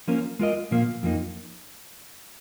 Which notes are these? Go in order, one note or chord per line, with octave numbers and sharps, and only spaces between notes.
F3 A#3 C#4 A#4
G#3 F4 A#4 D#5
A#2 F3 A#3
F2 F3 A#3 D#4